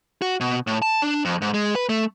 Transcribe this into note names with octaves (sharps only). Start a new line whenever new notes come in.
F#4
B2
A2
A5
D4
F2
G#2
G#3
B4
A3